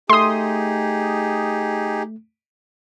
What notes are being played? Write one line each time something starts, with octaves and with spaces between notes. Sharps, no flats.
A3 D#4 G4 G#4 C6 D#6